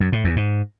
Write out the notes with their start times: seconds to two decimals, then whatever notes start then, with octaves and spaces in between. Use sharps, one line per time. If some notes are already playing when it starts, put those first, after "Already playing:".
0.01 F#2
0.12 A2
0.24 E2
0.36 G#2